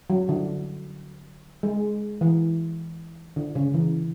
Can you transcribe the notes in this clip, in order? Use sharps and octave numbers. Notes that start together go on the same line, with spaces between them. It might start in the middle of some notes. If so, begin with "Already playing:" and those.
F#3
D3
G#3
E3
D3
C#3
E3